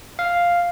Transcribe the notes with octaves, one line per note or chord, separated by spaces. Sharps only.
F5